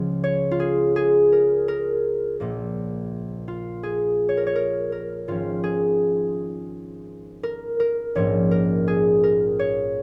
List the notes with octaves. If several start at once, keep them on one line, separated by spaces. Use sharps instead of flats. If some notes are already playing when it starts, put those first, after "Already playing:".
Already playing: C#2 C#3 F3 G#3 C#4
C#5
F4
G#4
G#4
A#4
A#4
A#1 A#2 A#3
F4
G#4
C#5
A#4
C#5
A#4
A#4
G#1 G#2 F3 C#4 F4
G#4
A#4
A#4
A#1 G#2 F3 A#3 C#4 C#5
A#4
G#4
A#4
C#5